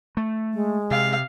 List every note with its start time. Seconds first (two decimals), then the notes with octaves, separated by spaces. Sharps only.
0.17 A3
0.53 G#3
0.91 C3 F5